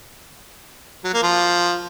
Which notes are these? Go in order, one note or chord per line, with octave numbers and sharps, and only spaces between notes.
F#3
A#3
F3